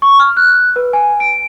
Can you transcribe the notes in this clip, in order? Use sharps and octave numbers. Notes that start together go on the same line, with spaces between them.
C#6
F6
F#6
B4
G#5
D7